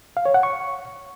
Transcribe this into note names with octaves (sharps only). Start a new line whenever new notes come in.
F5
C#5
F#5
C#6